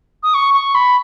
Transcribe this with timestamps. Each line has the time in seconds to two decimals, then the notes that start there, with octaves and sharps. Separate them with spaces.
0.23 D#6
0.34 C#6
0.54 C#6
0.75 B5